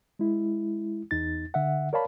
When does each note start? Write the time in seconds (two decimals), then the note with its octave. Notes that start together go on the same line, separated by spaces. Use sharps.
0.19 G#3 E4
1.11 E2 D#4 A6
1.54 D3 E5 F#5
1.93 A#4 C#5 D5 F5 A5 B5